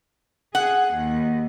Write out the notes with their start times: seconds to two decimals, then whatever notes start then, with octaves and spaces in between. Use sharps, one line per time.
0.55 G#4 F#5
0.93 D#2